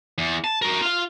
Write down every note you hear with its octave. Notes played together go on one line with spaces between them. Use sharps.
E2
A5
F#4 A#4
F4 F5